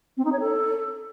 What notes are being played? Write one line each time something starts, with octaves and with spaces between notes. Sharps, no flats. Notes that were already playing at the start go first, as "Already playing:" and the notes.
C4
D#4
C#5
A4